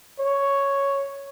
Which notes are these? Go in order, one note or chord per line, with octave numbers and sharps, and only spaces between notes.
C#5